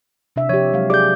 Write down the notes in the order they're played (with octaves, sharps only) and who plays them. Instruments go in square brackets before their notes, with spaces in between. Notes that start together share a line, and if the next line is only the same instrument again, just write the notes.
[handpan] C3 D4 E5
[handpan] F3 G4 [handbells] C#5
[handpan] F#3 G#3 F5
[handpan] G4 G#4 D5 [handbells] D6 G6